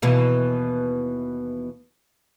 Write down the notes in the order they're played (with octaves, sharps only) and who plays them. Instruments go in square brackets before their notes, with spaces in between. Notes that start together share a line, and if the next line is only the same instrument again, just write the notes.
[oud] D#2 B2 E3